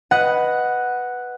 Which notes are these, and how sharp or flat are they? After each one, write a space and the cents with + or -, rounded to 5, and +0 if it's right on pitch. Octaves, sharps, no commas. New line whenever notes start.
B4 +0 D#5 +0 F#5 +0